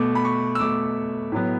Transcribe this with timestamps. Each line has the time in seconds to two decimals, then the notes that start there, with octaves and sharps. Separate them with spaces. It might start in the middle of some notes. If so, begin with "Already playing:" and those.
Already playing: B2 A3 D6
0.15 B5
0.25 C#6
0.55 E6
0.60 B2 A3 D6
1.32 A2 F#3 B3